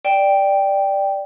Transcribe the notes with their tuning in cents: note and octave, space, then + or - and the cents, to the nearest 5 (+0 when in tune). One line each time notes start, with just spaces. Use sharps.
D5 +0 G5 +0